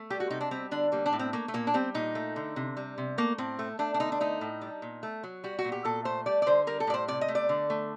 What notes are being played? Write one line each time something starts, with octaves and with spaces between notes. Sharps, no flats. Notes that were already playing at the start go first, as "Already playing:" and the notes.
Already playing: A3
G3 G4
F#4
C3 D#4
D4
G3 C4
D3 D4
G3 A#3
D4
A2
C4
A3 A#3
A3
A#2 A#3
D4
G3 C4
A#2 D#4
A3
D3
C3
G3
C3
A3 A#3
A2 C4
A3
A3 D4
D4
D3 D#4
D4
A3 D#4
A2
G3
A#2
A3
F#3
G3 F#4
F#4
A#2
G4
A#2 A4
A3 C5
G3 D5
D5
D3 C5
G3 A#4
A4
A2 D5
C5
C3 D5
D#5
A3
D5
D3
A3